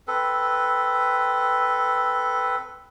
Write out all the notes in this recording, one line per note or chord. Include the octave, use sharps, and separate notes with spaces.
C4 A4 B4